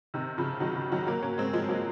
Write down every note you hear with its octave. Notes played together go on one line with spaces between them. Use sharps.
C3 D#3
C#3 F3
D#3 F#3
C#3
D#3 F#3
F#3 A#3
A#3 C#4
G#3 C4
F3 G#3
F#3 A#3